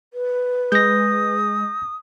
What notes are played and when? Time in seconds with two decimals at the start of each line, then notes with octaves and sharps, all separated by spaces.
0.14 B4
0.72 G#3 D#6 G6 A#6